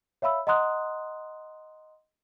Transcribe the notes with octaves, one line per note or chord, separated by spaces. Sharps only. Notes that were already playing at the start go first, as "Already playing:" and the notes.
C#5 E5 F5 B5 E6
D#5 F#5 A#5 C6 D#6 F#6